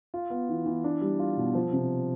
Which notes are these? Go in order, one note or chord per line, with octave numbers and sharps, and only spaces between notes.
F4
B3
E3
E3
D4
G3
F4
B2
F3
C3